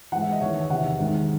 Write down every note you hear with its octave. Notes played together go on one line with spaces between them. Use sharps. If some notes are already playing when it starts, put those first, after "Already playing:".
G#2 E3 F#5
E5
D#5
E2 D#3 C#5
E5
E2 C3 D#3 F#5
E5
G#2 D#3